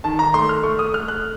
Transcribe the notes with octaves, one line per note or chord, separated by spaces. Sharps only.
D#3 A5
A#5
A3 C6
F6
A3 C#6
D#6
A3 F6
F#6